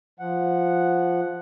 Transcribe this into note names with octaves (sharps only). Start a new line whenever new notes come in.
F3 F#5